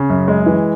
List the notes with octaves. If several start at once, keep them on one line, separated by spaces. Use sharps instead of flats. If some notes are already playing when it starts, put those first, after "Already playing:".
Already playing: C#3
F#2
G#3
E3